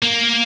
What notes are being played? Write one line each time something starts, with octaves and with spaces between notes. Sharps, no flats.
A#3